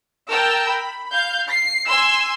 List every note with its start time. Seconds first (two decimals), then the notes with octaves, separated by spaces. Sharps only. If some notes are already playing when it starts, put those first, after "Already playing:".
0.30 A#4 G5 A5 E6
0.68 B5
1.12 F5 G6
1.52 C7
1.89 G#5 C6 E6